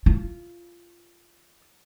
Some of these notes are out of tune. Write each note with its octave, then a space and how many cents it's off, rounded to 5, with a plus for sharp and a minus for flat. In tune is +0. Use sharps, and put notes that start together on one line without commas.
F4 -15